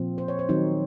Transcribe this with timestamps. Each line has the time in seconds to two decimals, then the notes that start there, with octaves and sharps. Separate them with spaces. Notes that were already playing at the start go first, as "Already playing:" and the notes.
Already playing: A#2 F3 C4
0.18 C5
0.28 C#5
0.39 C5
0.49 D#3 F#3 C4 D#4